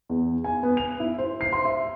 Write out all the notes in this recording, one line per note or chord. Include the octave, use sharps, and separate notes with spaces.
E2
G#5
B3
F7
E4
C5
C7
C6
E5